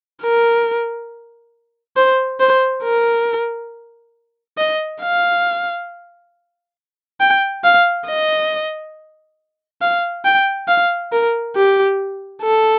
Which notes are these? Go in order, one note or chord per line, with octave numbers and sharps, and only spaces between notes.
A#4
C5
C5
A#4
D#5
F5
G5
F5
D#5
F5
G5
F5
A#4
G4
A4